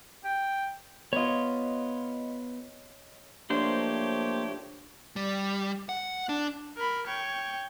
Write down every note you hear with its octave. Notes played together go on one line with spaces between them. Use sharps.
G5
B3 F4 C#5 D#5
F3 A3 A#3 D4 G4 C5 C#5
G3
F#5
D4
A#4 B5
C#5 G5